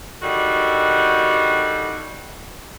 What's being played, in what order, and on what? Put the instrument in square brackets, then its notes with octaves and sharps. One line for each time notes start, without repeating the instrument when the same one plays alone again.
[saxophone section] D3 D#3 G3 F#4